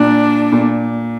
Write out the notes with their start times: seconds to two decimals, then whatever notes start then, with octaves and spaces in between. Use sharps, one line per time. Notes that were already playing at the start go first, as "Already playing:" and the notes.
Already playing: A#2 D4
0.52 A#2